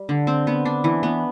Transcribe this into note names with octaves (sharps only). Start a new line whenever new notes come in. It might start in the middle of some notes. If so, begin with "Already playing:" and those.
Already playing: G3
D3
C4
B3
D4
E3
B3